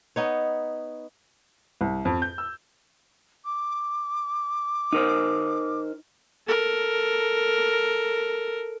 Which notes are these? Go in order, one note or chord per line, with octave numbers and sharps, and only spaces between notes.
B3 D#4 C#5
C2
F2
G6
E6
D6
D#4 A#4 C5
A4 A#4